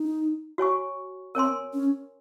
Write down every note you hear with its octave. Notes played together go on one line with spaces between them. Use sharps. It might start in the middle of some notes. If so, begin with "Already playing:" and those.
Already playing: D#4
F#4 C#5 G#5 C#6
C4 A#4 C#5 G#5 C6
C#4